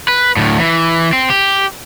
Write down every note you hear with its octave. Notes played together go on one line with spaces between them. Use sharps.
B4
D2 A2
E3
C4
G4